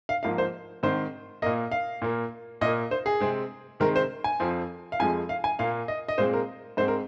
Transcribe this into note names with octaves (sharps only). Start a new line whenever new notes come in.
F5
G#2 F3 A#3 F5
C5
G#2 D#3 C4 C5
A#2 A#3 D#5
F5
A#2 A#3
A#2 A#3 D#5
C5
G#4
C3 G#3 C4
C3 D#3 G#3 C4 A#4
C5
G#5
F2 F3 C4
F5
F2 F3 G#3 G#5
F5
G#5
A#2 A#3 F5
D#5
D#5
A#2 G#3 C4 C5
A#4
G#2 G#3 C4 C5
A#4